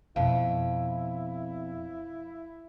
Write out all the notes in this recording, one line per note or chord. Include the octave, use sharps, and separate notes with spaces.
F2 B2 E4 F5